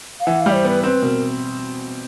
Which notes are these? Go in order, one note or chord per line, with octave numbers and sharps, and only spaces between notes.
F5
E3 F#5
G3 F5
C#5
C5
B3
B4
C4 B4
B2 A#4